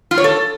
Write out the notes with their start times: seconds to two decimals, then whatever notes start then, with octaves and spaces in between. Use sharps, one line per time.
0.11 F4
0.18 C#5
0.24 A4